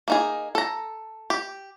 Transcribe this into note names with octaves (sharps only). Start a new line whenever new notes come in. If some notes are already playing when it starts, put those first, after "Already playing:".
A#3 D#4 G#4
A4 A#5
G4